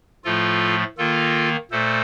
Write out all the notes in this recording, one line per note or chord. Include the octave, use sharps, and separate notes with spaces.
A2 F3 A3 F4 A4
D#3 A#3 F4 A4
A#2 A3 A4 C5